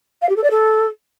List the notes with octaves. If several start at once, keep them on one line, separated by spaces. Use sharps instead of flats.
F5
G4
A4
D5
A4